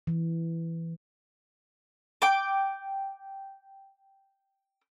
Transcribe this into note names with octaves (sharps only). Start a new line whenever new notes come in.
E3
G5 D6